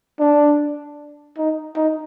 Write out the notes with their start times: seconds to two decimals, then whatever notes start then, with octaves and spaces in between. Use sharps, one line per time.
0.20 D4
1.38 D#4
1.76 D#4